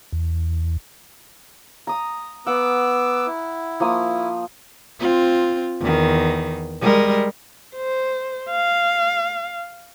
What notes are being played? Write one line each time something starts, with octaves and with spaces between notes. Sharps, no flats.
E2
A#5 D#6
B3 F#5 D6 E6
E4
F3 A#3 D#6
C4 F4
E2 D#3
G3 G#3 A#4
C5
F5